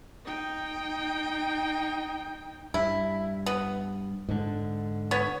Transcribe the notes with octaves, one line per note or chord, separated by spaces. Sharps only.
D#4 G5
G2 E4
B3
G#2 D3
B3 C#5